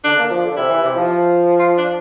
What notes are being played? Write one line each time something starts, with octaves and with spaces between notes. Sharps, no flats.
D3 D4
A#3
F3
D3
C3 E4
E3
C3
F3
F4
D4